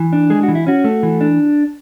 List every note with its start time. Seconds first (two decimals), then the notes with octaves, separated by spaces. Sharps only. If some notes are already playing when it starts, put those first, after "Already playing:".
Already playing: E3
0.13 D4
0.30 G#3 G#4
0.43 F#4
0.48 E3
0.55 E4
0.67 C#4 F#4
0.84 A3
1.03 E3
1.21 D4